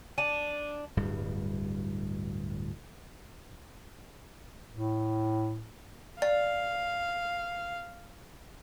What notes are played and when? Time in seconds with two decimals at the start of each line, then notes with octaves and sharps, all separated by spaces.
0.18 D4 A5 D#7
0.97 D1 G2 G3
4.71 A2
6.22 D5 F5